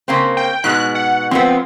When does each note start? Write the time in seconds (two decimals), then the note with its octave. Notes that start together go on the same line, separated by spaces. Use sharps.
0.08 C#3 A#3 C4
0.37 G5
0.64 G#2 B2 G#3 F#6
0.95 F#5
1.31 F3 G#3 B3 C4